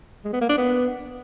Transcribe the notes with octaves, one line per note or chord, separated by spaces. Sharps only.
G#3
B3
A#3
D4
B3